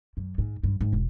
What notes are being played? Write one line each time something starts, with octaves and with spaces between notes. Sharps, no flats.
F#2
G#2
G2
G#2
E1